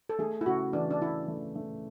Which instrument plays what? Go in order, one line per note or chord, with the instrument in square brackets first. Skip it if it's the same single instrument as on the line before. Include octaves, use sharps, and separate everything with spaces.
[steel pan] A4
[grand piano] A3 [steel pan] G#4
[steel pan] E4
[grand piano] C#3 [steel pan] F#4
[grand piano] E3 [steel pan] D4
[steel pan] D4
[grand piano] C#3 [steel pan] E4
[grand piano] A3
A3